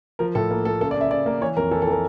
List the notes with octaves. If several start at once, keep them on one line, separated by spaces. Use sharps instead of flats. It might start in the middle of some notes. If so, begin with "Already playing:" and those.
F3 A#4
A2 A4
A#3
A#3 A4
C#3 A4
D5
C#3 E5
C#3 D5
A#3
E3 C#5
F2 A#4
E3 A4
A4
E3 A#4